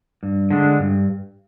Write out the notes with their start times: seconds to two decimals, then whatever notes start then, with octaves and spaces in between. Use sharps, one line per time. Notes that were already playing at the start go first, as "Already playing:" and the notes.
0.23 G2
0.50 D3 G#3 D4
0.79 G2